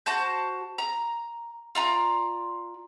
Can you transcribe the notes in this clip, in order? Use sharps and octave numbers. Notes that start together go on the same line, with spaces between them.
F#4 C5 A5 G6
A#5
F4 D5 A#5